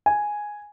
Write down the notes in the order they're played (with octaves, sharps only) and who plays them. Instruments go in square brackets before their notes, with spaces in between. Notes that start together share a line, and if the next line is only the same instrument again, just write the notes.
[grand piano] G#5